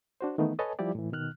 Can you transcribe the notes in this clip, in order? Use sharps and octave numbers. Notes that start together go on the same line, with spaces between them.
D4 F#4 C5
D#3 E3 A3 B3 D#4
A4 B4 C#5 D#5 G#5 A5
F3 G3 E4 G4 D5
A2 E3
B2 D#3 F6 F#6